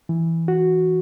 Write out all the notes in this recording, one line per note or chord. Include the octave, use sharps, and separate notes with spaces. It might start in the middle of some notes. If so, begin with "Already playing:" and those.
E3
F#4